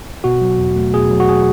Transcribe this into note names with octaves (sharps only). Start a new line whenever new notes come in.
B2 F#4
F#3
E2
A3
B2 G#4
F#3
F#4
G#4